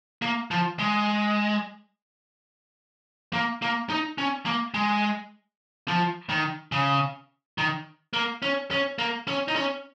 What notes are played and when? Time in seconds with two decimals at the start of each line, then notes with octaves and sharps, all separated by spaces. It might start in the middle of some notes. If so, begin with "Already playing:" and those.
0.22 A#3
0.51 F3
0.79 G#3
3.33 A#3
3.62 A#3
3.90 D#4
4.18 C#4
4.46 A#3
4.74 G#3
5.88 F3
6.30 D#3
6.72 C#3
7.58 D#3
8.13 A#3
8.42 C#4
8.71 C#4
8.98 A#3
9.28 C#4
9.48 D#4
9.56 C#4